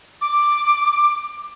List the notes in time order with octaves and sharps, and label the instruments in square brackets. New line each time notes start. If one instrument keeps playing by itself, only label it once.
[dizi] D6